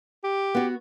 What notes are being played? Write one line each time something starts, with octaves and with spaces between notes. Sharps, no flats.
G4
B3 F#4